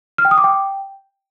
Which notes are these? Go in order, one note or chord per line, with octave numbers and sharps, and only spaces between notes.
F6
G5
D#6
D6
G5